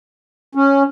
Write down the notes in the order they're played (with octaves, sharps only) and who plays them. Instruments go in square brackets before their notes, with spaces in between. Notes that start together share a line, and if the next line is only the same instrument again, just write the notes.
[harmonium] C#4